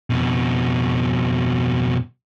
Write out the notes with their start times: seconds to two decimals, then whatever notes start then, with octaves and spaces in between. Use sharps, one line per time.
0.10 F2 B2